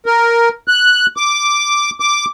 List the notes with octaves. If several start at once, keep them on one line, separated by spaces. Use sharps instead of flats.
A#4
F#6
D6
D6